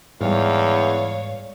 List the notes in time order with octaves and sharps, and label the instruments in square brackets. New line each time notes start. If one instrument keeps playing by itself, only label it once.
[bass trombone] E2 [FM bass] G#2 [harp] G3 F6 [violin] C#5 F5